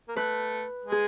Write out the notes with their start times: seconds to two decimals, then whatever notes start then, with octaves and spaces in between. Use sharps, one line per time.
0.08 A#3
0.16 A3 B4
0.84 G#3
0.92 G#4